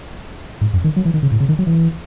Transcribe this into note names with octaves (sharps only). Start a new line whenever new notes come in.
G#2
F#2
D#3
F#3
E3
D#3
C#3
A2
C#3
D#3
F#3
E3